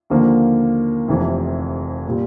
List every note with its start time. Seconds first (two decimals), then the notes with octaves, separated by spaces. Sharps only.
0.10 D#2 D3 F3 A#3
1.08 F1 F2 C3 E3
2.07 A#2 G3